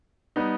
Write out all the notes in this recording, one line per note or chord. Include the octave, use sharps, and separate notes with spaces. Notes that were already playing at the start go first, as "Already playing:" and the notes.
G3 B3 D#4